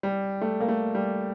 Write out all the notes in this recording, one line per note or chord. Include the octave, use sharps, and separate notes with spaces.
G3
A3
A#3
A3
G3